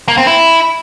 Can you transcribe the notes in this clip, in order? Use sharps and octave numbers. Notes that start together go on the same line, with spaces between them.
A#3
C4
E4